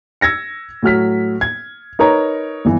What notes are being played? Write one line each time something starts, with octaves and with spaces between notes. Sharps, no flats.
E6 G#6 A#6 C#7
A2 F#3 F6 B6
G#6
D#4 A#4 B4 C#5 A#5
G1 E3